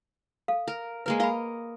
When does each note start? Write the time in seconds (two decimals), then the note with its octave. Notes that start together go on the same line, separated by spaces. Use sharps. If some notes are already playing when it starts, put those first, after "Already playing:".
0.48 A4 F5
0.68 A#4
1.06 G#3 A#3 A#4 B4
1.20 A#4 D#5 F5 B5